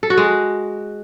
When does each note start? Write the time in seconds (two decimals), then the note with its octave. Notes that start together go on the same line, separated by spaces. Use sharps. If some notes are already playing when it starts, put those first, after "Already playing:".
0.03 A4
0.10 F#4
0.17 G#3